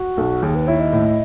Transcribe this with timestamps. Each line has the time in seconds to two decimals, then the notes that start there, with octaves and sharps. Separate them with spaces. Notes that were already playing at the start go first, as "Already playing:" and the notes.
Already playing: F#4
0.17 B1
0.42 D#2 G#4
0.55 B4
0.67 E4 C#5
0.80 D#5
0.93 A2